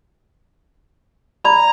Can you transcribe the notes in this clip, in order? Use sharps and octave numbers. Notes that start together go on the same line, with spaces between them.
D5 A#5 B5